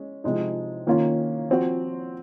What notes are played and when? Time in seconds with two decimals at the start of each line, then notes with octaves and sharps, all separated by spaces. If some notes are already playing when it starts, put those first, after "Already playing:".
Already playing: G#3 C#4
0.24 C3 F3 G#3 D#4
0.87 D#3 A#3 C#4 F4
1.49 F3 C4 F#4